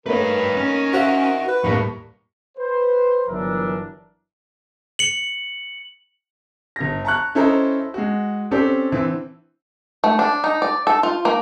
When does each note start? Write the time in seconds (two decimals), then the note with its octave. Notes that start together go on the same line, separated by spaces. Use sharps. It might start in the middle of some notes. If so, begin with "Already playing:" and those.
0.06 D#3 G3 A3 A#3 A#4 B4 C#5
0.57 C#4
0.93 F#4 C5 E5
1.48 B4
1.64 D#2 A2 G3 A#3 A#5 B5 C#6
2.58 B4 C5
3.28 G1 E3 F#3 D4 A#4 E5
4.99 C#7 F#7
6.76 G1 A#6
7.05 A5 A#5 C#6 F#6
7.35 C#4 E4 A4 C5 D#5 A#5
7.94 G#3 F#4
8.51 C4 C#4 G4 A4 C5 D5
8.92 D3 E3 C4
10.04 A3
10.19 D4
10.44 D#4
10.62 D5
10.87 A4
11.03 F4
11.25 A#3